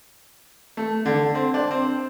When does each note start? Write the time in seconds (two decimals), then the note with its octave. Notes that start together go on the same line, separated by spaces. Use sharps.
0.77 A3
1.06 D3
1.35 C4
1.54 D4
1.71 C4